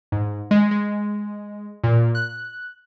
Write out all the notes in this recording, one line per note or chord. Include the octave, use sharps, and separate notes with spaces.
G#2
G#3
G#3
A#2
F#6